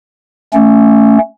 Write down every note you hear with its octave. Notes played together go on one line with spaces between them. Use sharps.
A3 C#4